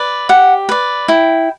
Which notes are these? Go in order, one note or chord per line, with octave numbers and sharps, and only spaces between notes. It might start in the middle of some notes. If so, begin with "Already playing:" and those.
Already playing: B4 D5
G4 F#5
B4 D5
E4 G5